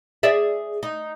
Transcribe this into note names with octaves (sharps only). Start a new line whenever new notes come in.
G#4 D5 E5
D#4